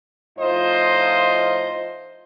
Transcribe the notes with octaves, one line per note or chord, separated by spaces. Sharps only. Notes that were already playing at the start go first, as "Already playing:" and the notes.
A2 F3 D#4 F4 C5 D#5